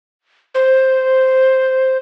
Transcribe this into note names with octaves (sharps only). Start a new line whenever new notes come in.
C5